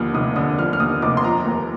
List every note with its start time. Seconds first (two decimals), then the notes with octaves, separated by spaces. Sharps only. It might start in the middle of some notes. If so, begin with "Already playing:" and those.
Already playing: D#2 D3 F3 D#6 F6
0.14 F1 D#6
0.36 D3 D#6
0.58 F3 F6
0.73 F6
0.80 D#2 D#6
1.02 F1 D6
1.17 C6
1.24 F3 A#5
1.46 D#2